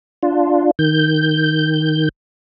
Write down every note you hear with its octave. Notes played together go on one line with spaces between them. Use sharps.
D4 F4
D#3 G6